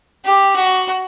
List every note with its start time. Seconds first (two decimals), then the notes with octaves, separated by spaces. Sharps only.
0.25 G4
0.56 F#4